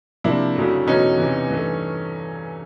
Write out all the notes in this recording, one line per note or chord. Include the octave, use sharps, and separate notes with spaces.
C3 F3 A#3 D4 E4
F2 C#3 F#3 A3
E2 B2 F#3 A3 C#4 D#4
E2 C3 E3
G2 E3 A3